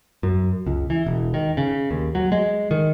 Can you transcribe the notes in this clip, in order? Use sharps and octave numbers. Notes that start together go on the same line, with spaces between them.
F#2
C#2
E3
E1
D#3
C#3
D#2
F#3
G#3
D#3